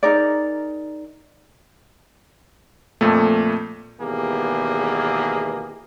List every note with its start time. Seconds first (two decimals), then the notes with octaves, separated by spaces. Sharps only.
0.03 D#4 G#4 A#4 D5
3.01 F2 A#2 A3
4.01 G#1 E2 B2 A#3 G4 G#4